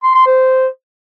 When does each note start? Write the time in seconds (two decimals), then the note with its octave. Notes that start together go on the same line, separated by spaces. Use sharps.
0.03 C6
0.15 C6
0.26 C5